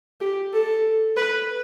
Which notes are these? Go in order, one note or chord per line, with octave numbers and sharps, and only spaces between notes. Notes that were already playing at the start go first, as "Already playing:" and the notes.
G4
A4
B4